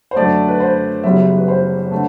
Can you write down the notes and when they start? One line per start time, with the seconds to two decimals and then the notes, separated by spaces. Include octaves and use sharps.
0.11 C5
0.16 F#2 D3 A3 D5
0.48 B4
0.60 C5
1.04 F#1 F#2 E3 G3 B3 E5
1.38 B4
1.48 C5
1.91 D3 A3